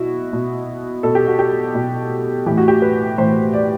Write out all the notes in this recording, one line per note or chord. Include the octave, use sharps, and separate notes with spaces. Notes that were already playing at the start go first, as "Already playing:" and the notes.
Already playing: B2 E4 F#4
B2
B2 A4
G4
F#4
G4
B2
A2 E3 G4
F#4
G4
B4
A2 E3 C5
D5